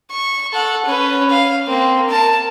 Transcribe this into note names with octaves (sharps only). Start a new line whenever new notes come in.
C#6
A4 F#5
C#4 B4
F5
A#3 C4
A#4 A5